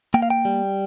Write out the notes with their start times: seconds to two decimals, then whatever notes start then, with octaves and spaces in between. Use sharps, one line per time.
0.14 A#3 G5
0.22 F5
0.30 G5
0.45 G3